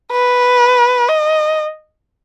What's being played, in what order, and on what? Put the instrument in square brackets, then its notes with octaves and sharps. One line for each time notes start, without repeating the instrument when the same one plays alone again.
[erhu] B4
D#5